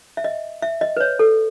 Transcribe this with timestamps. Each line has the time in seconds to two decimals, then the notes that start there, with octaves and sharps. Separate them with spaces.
0.17 E5
0.24 D#5
0.62 E5
0.81 D#5
0.97 B4
1.00 C#5
1.19 A4